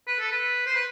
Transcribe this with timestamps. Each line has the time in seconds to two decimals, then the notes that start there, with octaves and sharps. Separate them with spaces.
0.07 B4
0.20 A4
0.31 B4
0.67 C5
0.75 B4